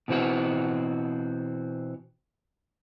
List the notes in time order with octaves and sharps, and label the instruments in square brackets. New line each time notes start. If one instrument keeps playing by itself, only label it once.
[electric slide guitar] B2 E3 C4 F#4